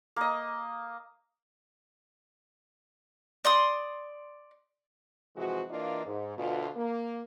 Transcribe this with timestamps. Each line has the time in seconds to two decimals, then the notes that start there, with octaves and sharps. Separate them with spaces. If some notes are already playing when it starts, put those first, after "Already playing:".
0.16 A#3 D#5
3.45 D5 C6 D#6
5.36 C3 E3 F3 G#3 F#4
5.70 E3 A#3 D4 F4 A#4 D#5
6.05 G#2
6.37 D2 B2 F4
6.77 A#3